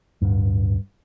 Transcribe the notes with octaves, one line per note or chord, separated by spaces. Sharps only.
D1 G2